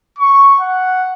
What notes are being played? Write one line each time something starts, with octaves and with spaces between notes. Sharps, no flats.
C#6
F#5